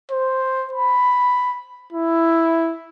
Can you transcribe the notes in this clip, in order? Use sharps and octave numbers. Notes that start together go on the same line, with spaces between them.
C5
B5
E4